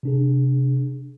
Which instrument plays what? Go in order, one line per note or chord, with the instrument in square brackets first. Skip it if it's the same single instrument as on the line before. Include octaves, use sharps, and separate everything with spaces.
[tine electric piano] C3 D4 G#4